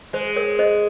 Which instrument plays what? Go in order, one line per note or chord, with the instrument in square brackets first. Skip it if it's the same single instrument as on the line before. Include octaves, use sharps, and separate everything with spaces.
[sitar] G#3 [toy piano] C5
[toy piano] A#4 C#5
C5 D#5